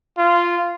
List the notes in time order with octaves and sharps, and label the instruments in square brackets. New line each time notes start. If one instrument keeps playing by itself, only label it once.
[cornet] F4